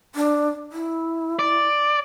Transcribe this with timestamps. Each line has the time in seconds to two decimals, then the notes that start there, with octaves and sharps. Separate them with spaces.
0.15 D4
0.72 E4
1.39 D5